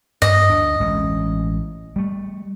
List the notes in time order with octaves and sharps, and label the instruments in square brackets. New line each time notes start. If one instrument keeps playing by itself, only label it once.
[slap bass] G2 [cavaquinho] D#5
[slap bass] D2 D4
A1 G#3 C#4
G3 A3